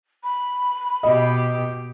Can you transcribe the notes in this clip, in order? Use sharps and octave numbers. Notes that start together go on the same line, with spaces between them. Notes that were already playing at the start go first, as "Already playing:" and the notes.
B5
B2 G4 D#5